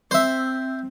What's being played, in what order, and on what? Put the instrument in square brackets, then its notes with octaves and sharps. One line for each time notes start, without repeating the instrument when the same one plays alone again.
[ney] C4 [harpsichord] C5 E5